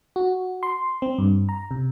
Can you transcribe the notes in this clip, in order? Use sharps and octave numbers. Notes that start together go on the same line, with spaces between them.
F#4
C6
C4
G2
A#5
C3